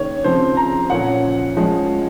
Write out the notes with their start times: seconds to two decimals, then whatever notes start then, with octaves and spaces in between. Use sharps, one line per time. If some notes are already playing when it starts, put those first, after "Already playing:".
Already playing: D#3 A#3 C#4 C#5
0.24 C#3 F3 C4 C5
0.57 A#5
0.90 A#2 F3 A#3 C#4 F#5
1.57 F3 G#3 C#4